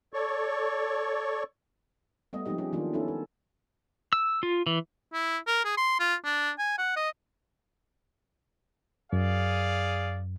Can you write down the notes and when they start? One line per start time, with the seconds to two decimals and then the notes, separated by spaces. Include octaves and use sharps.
0.14 A4 C#5 D5 C#6
2.33 G3 A3 B3 D#5
2.46 F3 G#3 C4 D#4 G4 D#5
2.58 C#4 G4
2.72 D#3 F#3 A3 A#3 D4 F4
2.93 B3 C#4 D#4 E4 A4
3.08 A4
4.13 E6
4.43 F4
4.67 E3
5.13 E4
5.47 A#4
5.65 G#4
5.77 C6
5.99 F4
6.25 D4
6.58 G#5
6.78 F#5
6.96 D#5
9.13 F#2 G#4 D5 F5